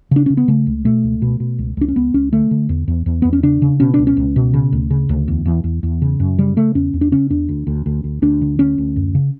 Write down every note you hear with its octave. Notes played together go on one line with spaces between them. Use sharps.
C#3 D4
C#3 C#4
B3
C#3 A3
C#2
B2 A3
C#2
B2
B2
C#2
C#2 D4
C#4
C#2 B3
C#2 C#4
D3 A3
D3
E2
E2
E2
E2 B3
C#4
C#3 D4
C#3
B2 C#4
C#2 D4
C#4
C#2
B2
C#3
D2
C#3
D2
E2
E2
E2
E2
C#3
F#2
C#3 G3
C#3 A3
E2 C#4
E2
D4
C#3 C#4
E2 D4
D2
D2
D2
D2
D2 D4
D3
D2 C#4
D2
F#2
C#3